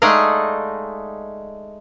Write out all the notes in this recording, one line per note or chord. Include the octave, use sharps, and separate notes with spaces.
G#3 A3 D#4 D5 D#5 F5